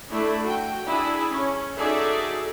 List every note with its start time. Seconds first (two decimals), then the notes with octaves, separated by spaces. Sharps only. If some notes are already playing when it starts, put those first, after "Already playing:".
0.10 A3 D4 E4
0.45 F#4 G5
0.86 D4 E4 G#4
1.29 C#4
1.77 D#4 F#4 G#4 A4 D5 E5